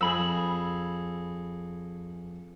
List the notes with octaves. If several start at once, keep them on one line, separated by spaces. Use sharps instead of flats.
F2 G#4 B5 E6